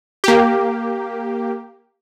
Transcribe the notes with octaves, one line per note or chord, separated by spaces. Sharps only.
A#3 G4